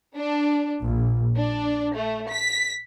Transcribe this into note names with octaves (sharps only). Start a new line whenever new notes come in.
D4
A#1
D4
A3
B6